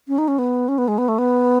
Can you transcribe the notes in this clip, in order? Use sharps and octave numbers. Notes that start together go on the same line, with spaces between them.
C#4
D#4
C#4
B3
C#4
B3
G#3
B3
A3
B3